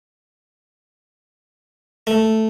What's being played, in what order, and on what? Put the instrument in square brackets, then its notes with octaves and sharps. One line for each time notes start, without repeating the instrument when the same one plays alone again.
[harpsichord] A3